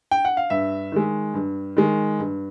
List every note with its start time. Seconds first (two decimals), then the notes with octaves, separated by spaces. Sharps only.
0.11 G5
0.25 F#5
0.37 F5
0.50 G2 E5
0.92 D#3 G#3
1.34 G2
1.77 D#3 G#3
2.19 G2